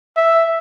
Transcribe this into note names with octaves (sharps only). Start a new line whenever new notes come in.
E5